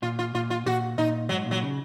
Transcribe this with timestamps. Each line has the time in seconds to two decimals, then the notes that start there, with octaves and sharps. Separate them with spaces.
0.02 A#2 F4
0.19 F4
0.34 A#2 F4
0.50 F4
0.66 A#2 F#4
0.98 A#2 D#4
1.29 G#2 F#3
1.46 A#2
1.51 F#3
1.62 C#3